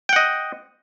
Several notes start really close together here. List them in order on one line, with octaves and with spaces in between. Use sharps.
G5 F#5 D#5